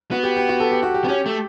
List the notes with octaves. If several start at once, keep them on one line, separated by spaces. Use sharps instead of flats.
B3 F#4
G4
G4
F#4
A4
G4
F#4
G4
B3
C#4 G4
A3